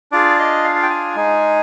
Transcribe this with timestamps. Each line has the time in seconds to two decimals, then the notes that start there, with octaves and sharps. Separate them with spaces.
0.12 D4 F4 G#4 D5
0.39 D#5
0.64 F5
0.76 F5
0.83 G5
0.90 G#5
1.16 G#3 D#4 G#4